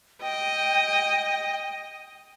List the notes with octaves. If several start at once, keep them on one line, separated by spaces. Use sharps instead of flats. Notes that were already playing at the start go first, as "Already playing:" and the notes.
D#5 G5